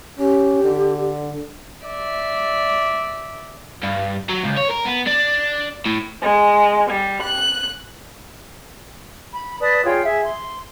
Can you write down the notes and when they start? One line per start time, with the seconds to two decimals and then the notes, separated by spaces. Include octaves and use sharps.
0.19 C#4 G4
0.64 D3
1.86 D5 E5
3.83 G2
4.29 F#3
4.43 C#2
4.57 C#5
4.70 A#4
4.85 B3
5.07 D4
5.85 A2
6.20 G#3
6.89 G3
7.22 F#6
9.32 B5
9.60 B4 D5 A5 D#6
9.85 F4 G#4 C#5 G5
10.05 G#4 E5
10.24 C6